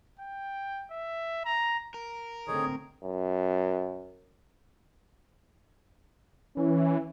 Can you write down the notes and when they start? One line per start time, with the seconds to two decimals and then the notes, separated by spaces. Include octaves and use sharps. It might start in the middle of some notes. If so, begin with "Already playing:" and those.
0.20 G5
0.91 E5
1.45 A#5
1.94 A#4
2.47 D3 A3 C4 D#4 G#4 C#5
3.04 F#2
6.57 E3 C#4